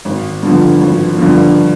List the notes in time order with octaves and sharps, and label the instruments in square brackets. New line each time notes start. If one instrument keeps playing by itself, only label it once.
[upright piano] G#1
G2 D3 F3
G#1
G2 D3 F3